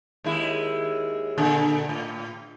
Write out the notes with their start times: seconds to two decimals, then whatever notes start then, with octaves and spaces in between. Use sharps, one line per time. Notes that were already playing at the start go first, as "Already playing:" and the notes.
0.24 D#2 G#3 E4
1.38 A#2 D3
1.89 A2